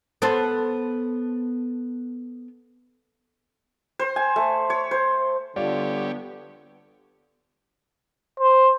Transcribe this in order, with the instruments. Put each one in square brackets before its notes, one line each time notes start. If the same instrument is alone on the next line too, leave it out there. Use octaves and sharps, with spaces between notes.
[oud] B3 A4 C5
[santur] C5
G#5
A3
C#5
C5
[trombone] D3 [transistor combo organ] G3 G4 C#5 [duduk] B3 [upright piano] F4 D5
[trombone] C5